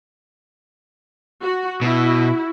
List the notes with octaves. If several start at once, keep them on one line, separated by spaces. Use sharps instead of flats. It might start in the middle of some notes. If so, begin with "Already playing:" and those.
F#4
B2 E4 F#4